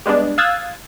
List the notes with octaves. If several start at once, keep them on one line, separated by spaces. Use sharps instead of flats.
G3 G#3 B3 D4
F5 D#6 E6 F#6 G#6 A6